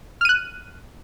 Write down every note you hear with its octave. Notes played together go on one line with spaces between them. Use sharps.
F6 F#6 D#7